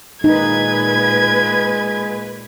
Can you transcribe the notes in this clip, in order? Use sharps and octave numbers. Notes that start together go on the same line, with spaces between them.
A#2 G#3 D#4 B4 G#6